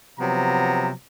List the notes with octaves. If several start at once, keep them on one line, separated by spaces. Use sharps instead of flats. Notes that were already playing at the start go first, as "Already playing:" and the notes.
C3 F3 F#3 B3 A#5